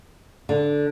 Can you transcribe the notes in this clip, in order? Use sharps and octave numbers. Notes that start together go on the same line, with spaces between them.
D3